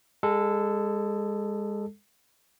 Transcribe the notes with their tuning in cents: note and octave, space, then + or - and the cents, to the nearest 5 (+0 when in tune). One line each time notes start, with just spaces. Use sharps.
G#3 -25 A4 +0